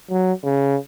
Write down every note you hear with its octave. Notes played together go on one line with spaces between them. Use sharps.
F#3
C#3